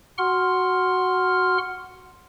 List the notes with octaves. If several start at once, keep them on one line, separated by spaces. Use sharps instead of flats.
F#4 F#5 C6 F6